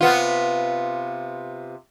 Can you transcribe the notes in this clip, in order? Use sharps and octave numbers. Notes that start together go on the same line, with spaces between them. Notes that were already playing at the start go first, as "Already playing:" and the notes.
C3 B3 F4